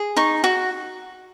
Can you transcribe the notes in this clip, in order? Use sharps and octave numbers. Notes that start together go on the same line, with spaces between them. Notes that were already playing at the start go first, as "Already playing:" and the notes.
Already playing: G#4
D#4 C#6
F#4